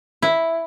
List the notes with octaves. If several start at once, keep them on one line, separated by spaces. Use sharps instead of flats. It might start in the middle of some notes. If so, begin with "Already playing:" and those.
E4